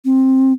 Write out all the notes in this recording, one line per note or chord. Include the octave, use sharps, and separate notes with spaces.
C4